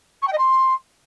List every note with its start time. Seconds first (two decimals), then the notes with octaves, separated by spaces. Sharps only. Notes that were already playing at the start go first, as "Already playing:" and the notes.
0.22 C#6
0.27 G5
0.33 D#5
0.38 C6